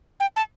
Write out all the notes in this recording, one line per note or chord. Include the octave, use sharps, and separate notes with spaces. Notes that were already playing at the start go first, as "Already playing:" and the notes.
G5
A5